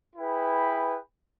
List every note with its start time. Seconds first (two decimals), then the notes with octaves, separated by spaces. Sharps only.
0.16 E4 G#4 B4 G5